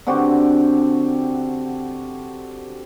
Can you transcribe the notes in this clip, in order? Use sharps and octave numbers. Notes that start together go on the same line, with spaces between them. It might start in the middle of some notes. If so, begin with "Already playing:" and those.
D3 C4 F#4 G4